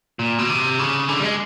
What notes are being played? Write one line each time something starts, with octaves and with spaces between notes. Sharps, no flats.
A#2
B2
C3
C#3
D3
G3
G#3